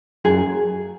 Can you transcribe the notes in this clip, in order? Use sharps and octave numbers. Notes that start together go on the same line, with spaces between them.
F#2 G#4 G#5